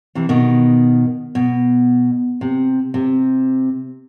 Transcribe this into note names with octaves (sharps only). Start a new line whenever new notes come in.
C3 E3
B2 D#3
B2
C3
C3